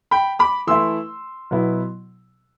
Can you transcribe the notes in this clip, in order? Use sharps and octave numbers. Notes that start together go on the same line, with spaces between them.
G5 B5
B5 D6
E3 A3 E4 C6 E6
B2 F#3 B3 E4